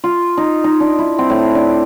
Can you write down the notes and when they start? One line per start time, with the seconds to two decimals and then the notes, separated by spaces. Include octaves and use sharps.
0.04 F4
0.37 D#4
0.64 D#4
0.80 D4
0.99 E4
1.19 C4
1.30 A2
1.55 D4